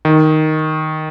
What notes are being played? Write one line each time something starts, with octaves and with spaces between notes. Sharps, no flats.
D#3